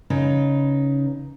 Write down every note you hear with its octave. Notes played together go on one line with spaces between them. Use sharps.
C#3 D#4 B4